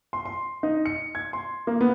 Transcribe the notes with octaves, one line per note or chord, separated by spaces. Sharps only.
C6
C6
D#4
C#7
G#6
C6
A#3
B3